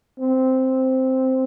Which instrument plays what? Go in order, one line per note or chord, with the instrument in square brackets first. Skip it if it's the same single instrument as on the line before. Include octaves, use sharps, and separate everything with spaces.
[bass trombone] C4